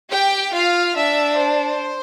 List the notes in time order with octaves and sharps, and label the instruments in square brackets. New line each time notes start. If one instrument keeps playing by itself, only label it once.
[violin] G4 [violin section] G5
[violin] F4 [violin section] F5
[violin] D4 [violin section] E5
[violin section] C5